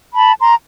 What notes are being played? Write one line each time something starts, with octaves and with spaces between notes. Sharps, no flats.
A5 B5
A#5 C6